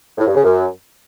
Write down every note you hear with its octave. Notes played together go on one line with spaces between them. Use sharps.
A2
G2
C#3
F#2